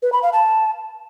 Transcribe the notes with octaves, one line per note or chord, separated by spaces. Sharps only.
B4
B5
F5
A5